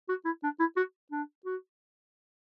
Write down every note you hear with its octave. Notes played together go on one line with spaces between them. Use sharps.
F#4
E4
D4
E4
F#4
D4
F#4